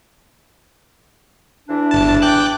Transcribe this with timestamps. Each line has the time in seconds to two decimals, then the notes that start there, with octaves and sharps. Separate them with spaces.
1.69 E2 E3 D4
1.91 G1 A5
2.22 G5 D6 F#6